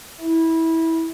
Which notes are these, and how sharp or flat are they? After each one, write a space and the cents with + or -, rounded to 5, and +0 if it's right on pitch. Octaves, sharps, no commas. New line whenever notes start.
E4 -20